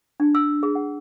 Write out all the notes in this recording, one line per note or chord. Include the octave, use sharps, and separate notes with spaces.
D4
E6
G#4
F#5